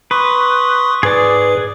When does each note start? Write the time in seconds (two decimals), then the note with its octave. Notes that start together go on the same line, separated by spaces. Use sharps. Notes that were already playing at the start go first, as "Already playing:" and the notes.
0.11 B4 C6 C#6 D#6
1.03 G#2 G#4 B4 D5